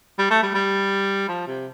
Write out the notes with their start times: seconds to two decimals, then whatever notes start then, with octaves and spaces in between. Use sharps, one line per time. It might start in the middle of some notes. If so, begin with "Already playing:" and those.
0.19 G3
0.31 A3
0.42 G3
0.54 G3
1.28 F3
1.47 C3